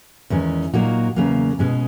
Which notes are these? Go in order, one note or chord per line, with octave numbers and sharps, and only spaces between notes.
E2 D#3 G#3 C#4
A#2 F#3 A#3 D#4 F#4
E2 C#3 F#3 A#3
B2 G#3 C#4